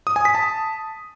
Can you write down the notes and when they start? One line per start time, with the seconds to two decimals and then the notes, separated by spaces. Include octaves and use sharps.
0.07 D#6
0.16 G#5
0.25 B6
0.35 A5